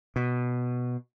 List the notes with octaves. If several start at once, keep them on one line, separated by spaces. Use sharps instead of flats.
B2